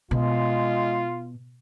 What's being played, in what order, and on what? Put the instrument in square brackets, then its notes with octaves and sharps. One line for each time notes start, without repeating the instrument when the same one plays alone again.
[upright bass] B2 [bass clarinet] G#3 [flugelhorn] F4